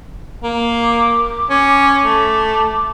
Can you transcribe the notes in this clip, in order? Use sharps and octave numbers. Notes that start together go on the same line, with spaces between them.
A#3
D6
C#4
A3